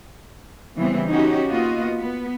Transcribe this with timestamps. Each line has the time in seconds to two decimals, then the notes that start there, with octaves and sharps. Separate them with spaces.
0.77 C#3 E3 G3 B3 C4
1.08 C#4 D#4 F#4 G4
1.48 A#3 B3 F4 F#4 D#5
1.99 B3